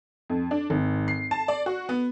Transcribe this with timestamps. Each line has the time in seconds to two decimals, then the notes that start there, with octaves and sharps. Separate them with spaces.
0.30 F2
0.51 D4
0.70 G#1
1.08 C7
1.31 A5
1.48 D5
1.66 F#4
1.89 B3